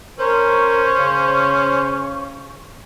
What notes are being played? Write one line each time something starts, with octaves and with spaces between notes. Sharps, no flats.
C#4 A#4 C5 C#6
C#3